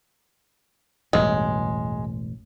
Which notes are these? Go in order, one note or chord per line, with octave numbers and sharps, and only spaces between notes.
E1 A1 G2 G#3